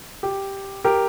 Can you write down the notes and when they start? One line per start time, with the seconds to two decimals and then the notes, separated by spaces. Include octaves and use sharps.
0.23 G4
0.84 G4 A#4